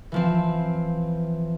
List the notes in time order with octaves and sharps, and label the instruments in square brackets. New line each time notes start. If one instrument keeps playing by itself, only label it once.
[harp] E3 F3 C4